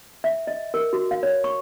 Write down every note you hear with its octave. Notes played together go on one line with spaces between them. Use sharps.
E5
D#5
A#4
F#4
F5
C#5
C#6